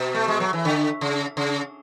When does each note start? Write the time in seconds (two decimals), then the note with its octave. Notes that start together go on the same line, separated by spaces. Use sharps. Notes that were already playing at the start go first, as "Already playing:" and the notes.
Already playing: B2
0.14 A3
0.28 G#3
0.40 F#3
0.53 E3
0.65 D3
1.01 C#3
1.37 C#3